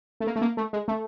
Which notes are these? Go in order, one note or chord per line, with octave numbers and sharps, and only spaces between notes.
A3
A#3
A3
A#3
A3
G#3
A3